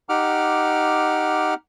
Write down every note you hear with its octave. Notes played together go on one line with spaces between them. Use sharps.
D#4 G4 F#5 D6 F6